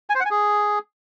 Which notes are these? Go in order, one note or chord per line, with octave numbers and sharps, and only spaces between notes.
G#5
C5
F#5
G#5
G#4